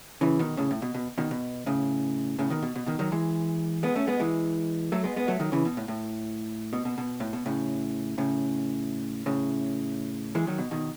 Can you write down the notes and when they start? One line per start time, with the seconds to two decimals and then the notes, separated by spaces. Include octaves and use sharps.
0.21 C#3 E3
0.39 B2 D#3
0.57 A2 C#3
0.71 A2
0.82 B2
0.94 B2
1.18 B2 D#3
1.31 B2
1.66 A2 C#3
2.39 A2 C#3
2.50 B2 D#3
2.62 B2
2.75 B2
2.86 B2 D#3
2.99 D#3 F#3
3.12 E3 G#3
3.83 G#3 B3
3.95 A3 C#4
4.07 G#3 B3
4.20 E3 G#3
4.92 F#3 A3
5.04 G#3 B3
5.16 G#3 B3
5.28 F#3 A3
5.40 D#3 F#3
5.52 C#3 E3
5.65 B2
5.77 A2
5.88 A2
6.73 B2
6.85 B2
6.98 B2
7.20 A2
7.33 B2
7.46 A2 C#3
8.18 A2 C#3
9.26 A2 C#3
10.35 E3 G#3
10.47 D#3 F#3
10.58 B2
10.71 B2 D#3